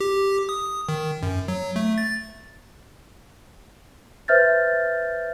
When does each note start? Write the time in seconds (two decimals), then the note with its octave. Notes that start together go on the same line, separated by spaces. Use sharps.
0.01 G4
0.49 D#6
0.89 D#3
1.23 F#2
1.48 F#3
1.76 A3
1.98 A6
4.28 B4 C5 E5 F6 G6 A6